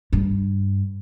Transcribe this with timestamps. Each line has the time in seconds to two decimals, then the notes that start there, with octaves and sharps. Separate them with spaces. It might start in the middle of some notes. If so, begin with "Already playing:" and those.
0.13 G2